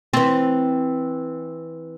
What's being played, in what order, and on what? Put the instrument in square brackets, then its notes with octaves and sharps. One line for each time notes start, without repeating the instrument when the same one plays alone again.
[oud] E3 C4